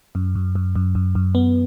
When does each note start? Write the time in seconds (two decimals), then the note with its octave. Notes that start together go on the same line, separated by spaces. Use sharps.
0.15 F#2
0.35 F#2
0.55 F#2
0.75 F#2
0.95 F#2
1.15 F#2
1.35 B3